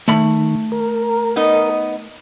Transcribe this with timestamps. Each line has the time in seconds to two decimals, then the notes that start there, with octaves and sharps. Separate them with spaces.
0.08 D#3 A3 B5
0.72 A#4
1.36 B3 D#4 D#5